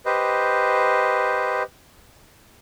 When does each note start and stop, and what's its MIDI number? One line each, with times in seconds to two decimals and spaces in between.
0.06 1.63 67
0.06 1.63 71
0.06 1.63 72
0.06 1.63 75